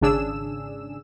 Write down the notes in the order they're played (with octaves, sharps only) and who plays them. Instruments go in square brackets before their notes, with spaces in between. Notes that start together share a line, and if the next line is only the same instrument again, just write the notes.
[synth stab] G#1 C#3 D4 G#4 E6 E7